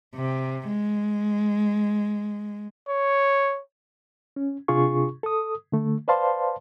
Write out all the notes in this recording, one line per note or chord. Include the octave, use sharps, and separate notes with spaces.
C3
G#3
C#5
C#4
C3 D4 F4 G#4 C#6
A4 D#6
D3 A3
B4 C5 D5 F5 A5 C6